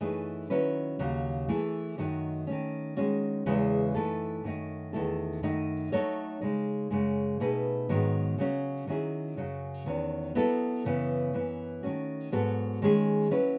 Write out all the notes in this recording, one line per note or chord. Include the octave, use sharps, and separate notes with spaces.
F#2 E3 A3 D#4 G#4
D#3 F#3 C#4 E4 B4
D#2 C#3 F#3
E3 A3 E4 G#4
F#2 D#3 F#3 A3 D#4
D#3 A3 C#4
D#3 G#3 C#4 F#4
E2 C#3 E3 G#3
F#2 E3 A3 D#4 A4
F#2 D#3 A3 D#4
E2 D#3 A3 E4 A4
F#2 D#3 A3 D#4
F#3 A3 D#4 A4 C#5
C#3 G#3 D#4
F#2 C#3 G#3
B2 A3 D#4 G#4 B4
G#2 D#3 F#3 B3
C#3 F#3 C#4
D#3 F#3 C#4 E4 G#4
F#2 C#3 F#3
E2 D#3 F#3 C#4 F#4
F#3 B3 E4 A4
F#2 C#3 E3 B3
F#2 E3 B3
D#3 A3 C#4 F#4
G#2 F#3 B3 F#4 A4
D#3 G#3 C#4 G#4
F#3 C#4 E4 B4